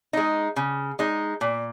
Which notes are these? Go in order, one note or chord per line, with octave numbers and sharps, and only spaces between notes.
G#3 D#4
C#3
G#3 D#4
A#2